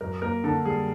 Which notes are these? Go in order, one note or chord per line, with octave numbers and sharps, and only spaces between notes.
F#2 A#4
A#3 A#4
D3 A4
G3 G#4